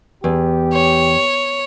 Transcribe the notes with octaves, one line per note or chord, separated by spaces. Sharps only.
E2 G4
C#5